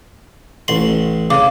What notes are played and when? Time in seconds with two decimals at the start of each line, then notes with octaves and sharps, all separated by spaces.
0.68 A1 C6 F#7
1.30 C#3 F5 D6